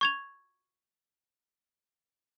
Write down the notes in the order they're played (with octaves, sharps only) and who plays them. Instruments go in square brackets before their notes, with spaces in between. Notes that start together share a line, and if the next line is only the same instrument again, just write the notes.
[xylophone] C#6 G#6 F7